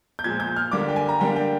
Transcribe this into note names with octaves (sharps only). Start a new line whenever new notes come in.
G6
A#2 F3 G#3 G#6
G6
F6
D3 G3 A#3 D4 D6
G5
G#5
A#5
D3 G3 A#3 D4 G5
G5